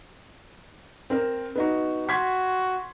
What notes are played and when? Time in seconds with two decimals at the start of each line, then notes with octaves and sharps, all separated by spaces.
1.10 C4 A#4 C5
1.55 B3 D#4 F#4
2.09 F#4 C6 G#6 B6